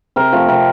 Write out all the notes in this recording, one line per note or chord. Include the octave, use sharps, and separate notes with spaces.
C3 A#4
F3 A3
C3 A#4